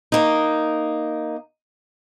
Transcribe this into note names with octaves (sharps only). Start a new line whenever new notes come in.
A#3 D#4